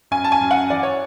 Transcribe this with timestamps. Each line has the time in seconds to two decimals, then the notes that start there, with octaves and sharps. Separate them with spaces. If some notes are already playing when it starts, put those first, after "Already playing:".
0.11 F#2 G#5
0.24 A5
0.32 G#5
0.41 F#2
0.51 F#5
0.70 E3 D5
0.83 C#5